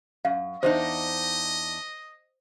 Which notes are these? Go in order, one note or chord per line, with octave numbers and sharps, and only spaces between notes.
F#2 F5
E2 D4 D#4 C5 D#5